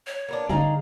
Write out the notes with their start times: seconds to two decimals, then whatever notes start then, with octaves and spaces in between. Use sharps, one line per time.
0.07 C#5
0.29 A#3 B3 D4
0.49 D3 A3 D#4 G#4 D5 F5 A#5